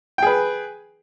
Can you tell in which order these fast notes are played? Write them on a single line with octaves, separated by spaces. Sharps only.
G5 G#4 B4